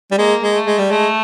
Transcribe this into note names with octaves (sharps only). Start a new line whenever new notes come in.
G3
G#3 A#3
G#3
A3
G#3
G3
G#3 A3